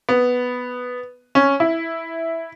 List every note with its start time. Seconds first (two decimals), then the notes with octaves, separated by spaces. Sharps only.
0.09 B3
1.35 C#4
1.60 E4